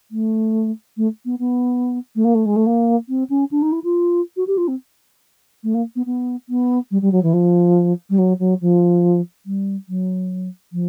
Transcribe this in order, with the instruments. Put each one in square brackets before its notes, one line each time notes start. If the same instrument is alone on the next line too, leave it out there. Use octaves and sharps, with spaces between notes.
[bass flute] A3
A3
B3
B3
A3
A#3
A3
G#3
A3
A#3
C4
C#4
D4
D#4
E4
F4
F#4
G4
F4
C4
A3
A#3
B3
B3
B3
G3
G3
F#3
E3
F3
G3
F#3
F#3
F3
G3
F#3
F3